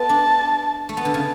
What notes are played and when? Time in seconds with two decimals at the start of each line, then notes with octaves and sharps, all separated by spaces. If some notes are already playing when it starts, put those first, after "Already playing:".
Already playing: A3 B3 A5
0.09 D4
0.89 A3
0.96 B3 A5
1.05 D3
1.14 C#3